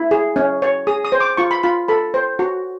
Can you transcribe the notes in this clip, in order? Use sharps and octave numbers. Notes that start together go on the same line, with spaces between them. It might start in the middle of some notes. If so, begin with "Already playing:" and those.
Already playing: E4 B5
G#4
C#4
C#5
G#4 D#6
D#6
C5
D6
F4 C#6
B5
F4 B5
A4 B5
C5
F#4